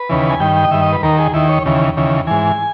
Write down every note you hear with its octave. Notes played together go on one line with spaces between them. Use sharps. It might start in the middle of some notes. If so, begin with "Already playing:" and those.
Already playing: B4
D#2 C#3 E3
G#5
G2 D#3 G5
G5
D#5
G2 D#3 E5
D#5
B4
D#2 D#3 A#4
G#4
D#2 D#3 E4
C#5
D#2 C#3 E3
D#2 C#3 E3
G#2 E3 G#5